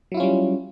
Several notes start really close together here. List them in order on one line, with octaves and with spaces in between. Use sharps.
F#3 E4 F4 C#4 G3